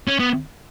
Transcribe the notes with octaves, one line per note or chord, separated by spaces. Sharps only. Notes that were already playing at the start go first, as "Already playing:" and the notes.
C#4
B3